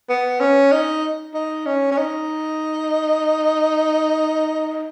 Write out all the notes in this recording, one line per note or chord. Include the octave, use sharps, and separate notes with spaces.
B3
C#4
D#4
D#4
C#4
C#4
D#4